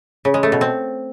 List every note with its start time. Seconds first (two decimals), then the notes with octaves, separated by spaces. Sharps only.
0.25 C#3
0.34 G#3
0.43 A3
0.52 B2
0.61 C4